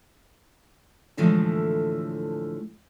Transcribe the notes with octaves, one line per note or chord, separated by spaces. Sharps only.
A2 D3 E3 F3 G#3 A3